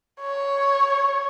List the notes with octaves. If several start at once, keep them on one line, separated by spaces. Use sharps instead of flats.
C#5